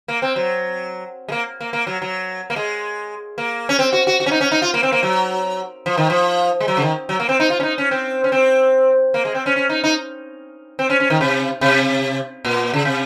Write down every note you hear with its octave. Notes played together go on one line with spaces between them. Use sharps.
A#3
C4
F#3
G#3
A#3
A#3
A#3
F#3
F#3
A#3
G#3
A#3
C#4
C4
F#4
F#4
F#4
C#4
D#4
C#4
D#4
F4
A#3
C4
A#3
F#3
F3
D#3
F3
G#3
F#3
C#3
D#3
F#3
A#3
C4
D#4
F4
C#4
D#4
C#4
C4
C#4
C4
A#3
G#3
C4
C#4
C#4
D#4
D#4
C4
C#4
C#4
D#3
C3
C3
A#2
C#3
C3